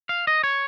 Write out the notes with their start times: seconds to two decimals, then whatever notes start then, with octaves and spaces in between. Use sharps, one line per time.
0.09 F5
0.27 D#5
0.44 C#5